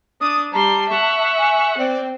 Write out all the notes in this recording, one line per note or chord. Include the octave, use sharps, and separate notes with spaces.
D4 D#6
G3 A5 A#5 C6
E5 F#5 C#6
G#5
C4 D5 G5